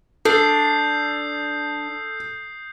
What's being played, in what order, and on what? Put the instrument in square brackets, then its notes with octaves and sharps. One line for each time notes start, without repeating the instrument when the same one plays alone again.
[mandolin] D4 [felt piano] A4 [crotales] D#6 G6 C7